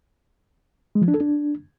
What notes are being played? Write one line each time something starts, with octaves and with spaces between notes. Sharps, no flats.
G#3
F3
D4
A4
D4